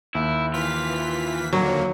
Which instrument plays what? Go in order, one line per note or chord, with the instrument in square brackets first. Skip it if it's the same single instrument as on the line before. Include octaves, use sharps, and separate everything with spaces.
[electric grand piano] D#2 [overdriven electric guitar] E4
[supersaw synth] E3 B6 [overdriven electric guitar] F4
[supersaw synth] F2 D3 A#3 [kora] F#3